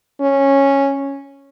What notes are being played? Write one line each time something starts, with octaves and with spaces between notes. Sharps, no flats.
C#4